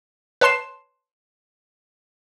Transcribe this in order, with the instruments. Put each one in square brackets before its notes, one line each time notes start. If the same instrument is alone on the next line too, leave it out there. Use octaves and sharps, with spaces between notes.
[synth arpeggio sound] B4 C#5 A5 C6 C7 E7